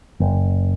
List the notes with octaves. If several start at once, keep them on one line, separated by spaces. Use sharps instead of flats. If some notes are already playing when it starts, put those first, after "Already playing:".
F#1